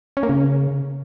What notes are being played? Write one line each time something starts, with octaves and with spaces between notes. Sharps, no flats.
C#4
A#3
C#3